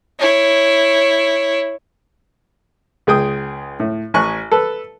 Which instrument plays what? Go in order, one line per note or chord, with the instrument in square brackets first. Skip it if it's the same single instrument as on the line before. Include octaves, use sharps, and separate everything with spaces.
[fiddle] E4 C#5
[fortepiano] C#2 G#4 G5 D#6
A2
A1 G#5 C#6 F#6
A4 B4